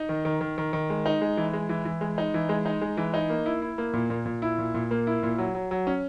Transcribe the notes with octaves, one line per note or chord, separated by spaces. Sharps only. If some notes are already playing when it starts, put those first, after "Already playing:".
Already playing: D#4
D#3
D#3
D#3
D#3
D#3
G#3
D#4
G#3
E3
G#3
E3
E3
G#3
D#4
E3
G#3
D#4
G#3
E3
D#4
A#3
E4
E4
A#3
A#2
A#2
A#2
E4
A#2
A#2
A#3
E4
A#2
F#3
F#3
F#3
C#4